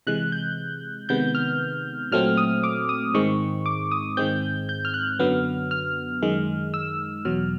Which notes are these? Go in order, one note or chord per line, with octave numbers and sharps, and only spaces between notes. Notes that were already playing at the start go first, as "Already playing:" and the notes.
C3 E3 G#3 F#6
G6
C3 D#3 G#3 B3 G6
F6
A#2 F#3 A3 C4 F6
D#6
D6
D#6
G#2 D#3 G#3 C4 C#6
D6
D#6
G#2 D#3 G#3 C4 G6
G6
F6
F#6
F#2 D3 F#3 B3 F6
F6
F#2 D#3 G#3
E6
E2 B2 F#3 F6